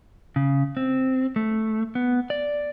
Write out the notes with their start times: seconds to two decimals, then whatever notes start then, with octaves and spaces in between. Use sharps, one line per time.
0.36 C#3
0.77 C4
1.36 A3
1.95 B3
2.30 D5